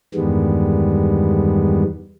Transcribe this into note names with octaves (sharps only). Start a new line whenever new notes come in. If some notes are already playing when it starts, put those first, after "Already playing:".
E2 G2 D#3 G3 G#3 B3